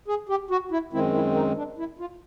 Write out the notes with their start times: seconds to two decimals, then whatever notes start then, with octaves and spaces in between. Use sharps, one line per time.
0.08 G#4
0.29 G4
0.51 F#4
0.72 E4
0.93 F#2 D#3 G#3 C4 E4
1.14 E4
1.36 D#4
1.57 D4
1.78 E4
1.99 F4